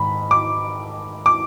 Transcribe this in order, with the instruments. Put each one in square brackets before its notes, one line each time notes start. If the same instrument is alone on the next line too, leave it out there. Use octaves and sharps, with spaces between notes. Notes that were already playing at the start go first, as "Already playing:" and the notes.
Already playing: [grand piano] G#2 D#3 B5
D6
D6